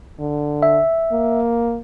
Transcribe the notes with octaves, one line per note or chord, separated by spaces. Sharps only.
D3
E5
A#3